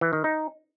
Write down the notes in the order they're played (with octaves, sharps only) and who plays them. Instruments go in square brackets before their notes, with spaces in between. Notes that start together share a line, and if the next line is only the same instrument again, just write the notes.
[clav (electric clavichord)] E3
D#3
D#4